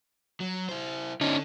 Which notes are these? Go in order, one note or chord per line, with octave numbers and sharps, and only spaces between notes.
F#3
E4 C5
D3 C#4 D#4